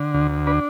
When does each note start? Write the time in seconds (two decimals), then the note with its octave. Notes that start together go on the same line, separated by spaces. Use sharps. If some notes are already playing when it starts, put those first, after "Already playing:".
Already playing: D3
0.14 D2
0.47 D4 B4